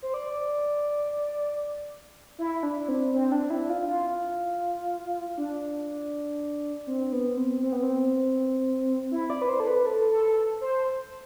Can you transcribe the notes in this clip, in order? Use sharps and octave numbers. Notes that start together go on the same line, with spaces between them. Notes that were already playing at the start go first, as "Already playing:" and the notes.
C5
D5
E4
D4
C4
C4
D4
E4
F4
F4
D4
C4
B3
C4
C4
B3
C4
E4
D5
B4
C5
A4
B4
A4
A4
C5